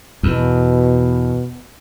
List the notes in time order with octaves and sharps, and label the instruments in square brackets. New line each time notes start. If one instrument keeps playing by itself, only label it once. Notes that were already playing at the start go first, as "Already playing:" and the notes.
[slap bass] E2 [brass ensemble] B2